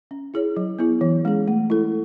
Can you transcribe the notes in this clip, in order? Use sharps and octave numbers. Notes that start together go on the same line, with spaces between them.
C#4
E4 G#4 C#5
F#3
B3 E4 G#4
E3
G#3 C#4 G#4
A3
E4 A4